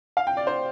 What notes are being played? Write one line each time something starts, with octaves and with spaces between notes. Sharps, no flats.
F5
G5
D5
C5